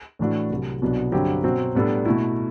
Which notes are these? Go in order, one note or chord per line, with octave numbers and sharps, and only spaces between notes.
A2 E3 A3 D4 F#4
C2 C3 F#3
C2 B2 F#3 B3 D4
G2 D3 F#3 C4 G4
B2 F#3 C4
A2 G3 B3 D4 A4
B2 A3 E4